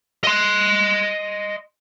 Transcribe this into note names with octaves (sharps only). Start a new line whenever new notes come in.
D#5 C6